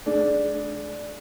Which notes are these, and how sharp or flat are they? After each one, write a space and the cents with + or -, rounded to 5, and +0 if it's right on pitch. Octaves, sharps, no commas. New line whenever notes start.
A3 -45 D4 +0 G#4 +20